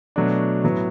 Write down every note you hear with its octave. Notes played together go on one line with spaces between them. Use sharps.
B2 F#3 A3 D4
A2 F#3 B3